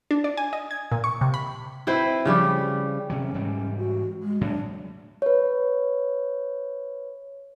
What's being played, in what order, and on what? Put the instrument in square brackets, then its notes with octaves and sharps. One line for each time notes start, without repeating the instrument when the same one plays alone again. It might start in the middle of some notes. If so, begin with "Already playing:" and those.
[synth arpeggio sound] D4
D5
G#5
D#5
G#6
A#2
C#6
C3
B5
[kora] C4 E4 B4 C5
C#3 F3 G3 G4
[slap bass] C3 E3 F#3 [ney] C#4
[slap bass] G#2 E3 G3
[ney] F#4
G#3
[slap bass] A2 F#3 G#3 [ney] D4
[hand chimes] B4 C#5